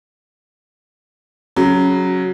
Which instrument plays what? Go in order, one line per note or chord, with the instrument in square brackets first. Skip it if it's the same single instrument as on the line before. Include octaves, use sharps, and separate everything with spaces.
[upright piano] C#3 F#3